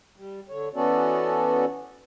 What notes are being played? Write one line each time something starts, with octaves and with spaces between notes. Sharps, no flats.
G3
D3 C#5
E3 B3 C#4 F#4 A4 D5